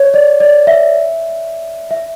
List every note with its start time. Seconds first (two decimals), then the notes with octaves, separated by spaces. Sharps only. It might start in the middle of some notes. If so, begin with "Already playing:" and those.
Already playing: C#5
0.14 D5
0.40 D5
0.67 E5
1.91 E5